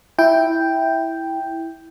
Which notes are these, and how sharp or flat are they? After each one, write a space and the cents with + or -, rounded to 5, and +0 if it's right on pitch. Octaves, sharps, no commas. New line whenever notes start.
E4 -5 G5 +0